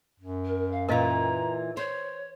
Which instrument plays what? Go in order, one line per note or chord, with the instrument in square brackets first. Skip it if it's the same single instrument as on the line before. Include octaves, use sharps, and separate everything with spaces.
[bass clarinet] F#2
[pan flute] A#4
F5
[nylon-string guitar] A#2 E3 [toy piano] A#4 D#5 F5 [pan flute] A#5
[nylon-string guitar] C5 [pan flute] C#5